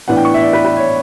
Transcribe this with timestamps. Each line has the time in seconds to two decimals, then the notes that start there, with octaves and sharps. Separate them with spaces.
0.08 A2 E3 B3 D4 F#5
0.17 G5
0.25 C#6
0.34 E5
0.42 D5
0.53 B4
0.65 B4
0.77 C#5